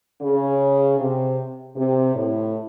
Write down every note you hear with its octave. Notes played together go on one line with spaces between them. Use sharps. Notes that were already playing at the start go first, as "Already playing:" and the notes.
C#3
C3
C3
A2